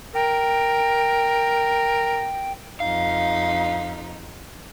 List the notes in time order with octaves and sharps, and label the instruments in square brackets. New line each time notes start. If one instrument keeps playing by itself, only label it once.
[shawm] A#4 [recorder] G5
[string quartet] F2 D#4 [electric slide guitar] F5